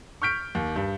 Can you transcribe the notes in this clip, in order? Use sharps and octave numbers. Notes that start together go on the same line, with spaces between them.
C#6 F6 G6 B6 D7
D#2
G2